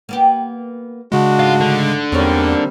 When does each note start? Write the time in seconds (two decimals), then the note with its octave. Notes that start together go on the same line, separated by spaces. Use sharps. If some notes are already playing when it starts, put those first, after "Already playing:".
0.09 A#3 B3 G4
1.12 C#3 G#3 D4 F#4
1.39 G#2 A3 F4
1.61 D3
2.12 E2 G#2 G3 A#3 C4 C#5